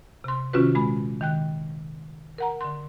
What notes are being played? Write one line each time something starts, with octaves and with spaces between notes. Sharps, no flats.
C3 C6
C3 D#3 C#4 F4 F#4 B4
A#2 G#3 B5
D#3 G5 F#6
A#4 F#5 A#5
D3 C6